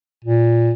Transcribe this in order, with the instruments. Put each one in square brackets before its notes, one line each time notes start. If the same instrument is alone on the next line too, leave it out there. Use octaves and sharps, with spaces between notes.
[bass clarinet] A#2